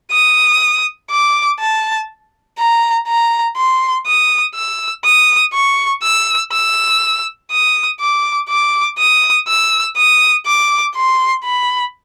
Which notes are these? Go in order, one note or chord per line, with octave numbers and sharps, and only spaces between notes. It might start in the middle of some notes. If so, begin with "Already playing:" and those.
D#6
D6
A5
A#5
A#5
C6
D#6
E6
D#6
C#6
E6
E6
D#6
D6
D6
D#6
E6
D#6
D6
C6
B5